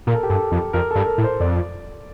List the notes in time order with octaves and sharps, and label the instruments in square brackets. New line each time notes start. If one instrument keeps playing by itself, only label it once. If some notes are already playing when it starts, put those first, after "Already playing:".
[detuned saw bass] A#2 [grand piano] A#4
[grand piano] A4
G4
[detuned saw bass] G2 [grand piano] A4
[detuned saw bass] F2
[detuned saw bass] F2 [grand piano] A#4
[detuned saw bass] G2 [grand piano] A4
[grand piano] A#4
[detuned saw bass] A2
[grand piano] C5
[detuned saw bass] F2 [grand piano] D5